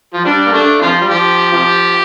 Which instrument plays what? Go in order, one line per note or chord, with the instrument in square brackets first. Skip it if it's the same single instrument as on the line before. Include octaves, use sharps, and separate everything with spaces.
[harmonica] F3
[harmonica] G3 [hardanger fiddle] D4
[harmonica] A#3
[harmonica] A3 [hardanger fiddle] D4
[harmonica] C3 F3 [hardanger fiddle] F4
[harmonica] G3
[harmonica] F3 [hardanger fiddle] G4
[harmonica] C3 F3